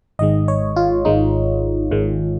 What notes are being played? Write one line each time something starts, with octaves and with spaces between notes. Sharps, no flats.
G#1 G#2 D#3 G#3 D#5
C#5
F4
G#1 G#2 D#3 G#3 D#4
G#1 G#2 D#3 G#3